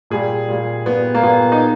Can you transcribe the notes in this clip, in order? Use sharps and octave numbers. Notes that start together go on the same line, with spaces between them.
A#2 G3 G#4
A#2 G3
A#2 G3 B3
A#3
A#2 G3 B3
D#4